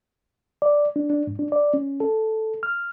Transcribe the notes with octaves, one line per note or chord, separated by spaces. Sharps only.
D5
D4
D4
G#2
D4
D5
C#4
A4
F6